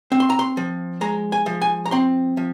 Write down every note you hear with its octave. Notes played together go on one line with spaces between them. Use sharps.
C4
C6
A#5
C6
F3
G#3 A#5
G#5
F3
G#5
A#5
C4 C6
F3